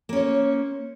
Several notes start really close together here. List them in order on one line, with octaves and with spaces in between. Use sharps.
A#3 C#4 C#5 C5